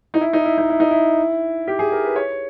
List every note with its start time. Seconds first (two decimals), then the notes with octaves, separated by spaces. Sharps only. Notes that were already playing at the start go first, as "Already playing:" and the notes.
0.14 D#4
0.21 E4
0.33 D#4
0.45 E4
0.58 D#4
0.70 E4
0.80 D#4
0.91 E4
1.68 G4
1.79 G#4
1.92 A#4
2.04 B4
2.16 C#5